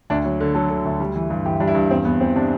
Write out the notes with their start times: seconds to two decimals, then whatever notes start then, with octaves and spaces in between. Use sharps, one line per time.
0.10 D2 D4
0.25 F#3
0.40 D3
0.55 F#3 A4
0.70 D3
0.85 D2
1.00 G3
1.16 E3
1.30 G2
1.45 E3 G4
1.60 G3 D4
1.68 E4
1.75 G2
1.91 E2 C4
2.05 E2 B3
2.20 E2 C4
2.35 C3 D4